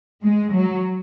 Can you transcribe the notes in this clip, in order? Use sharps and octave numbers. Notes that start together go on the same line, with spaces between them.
G#3
F#3